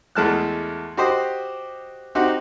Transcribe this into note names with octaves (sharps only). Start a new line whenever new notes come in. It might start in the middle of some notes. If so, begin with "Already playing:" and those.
E2 G#3 A3 A5 F6 F#6
F#4 G4 C5 D#5
C4 D#4 F#4 G4 F#5